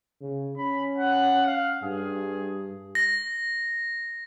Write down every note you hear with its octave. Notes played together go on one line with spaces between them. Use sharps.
C#3
C#4 B5
F#5
F5
G2 G#4
A#6